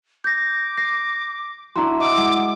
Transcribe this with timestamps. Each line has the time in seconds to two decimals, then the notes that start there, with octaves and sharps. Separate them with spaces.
0.24 D6 G6 A#6
0.77 A#6 C7
1.76 D4 E4 F#4 A#5 C6
2.00 D#5 F#5 D6 E6
2.18 G#3 F#5